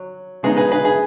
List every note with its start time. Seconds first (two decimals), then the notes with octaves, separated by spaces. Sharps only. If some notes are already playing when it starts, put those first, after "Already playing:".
Already playing: F#3
0.43 C#3 G#3 B3 D#4 G#4
0.57 G#4 B4
0.72 G#4 B4
0.85 G#4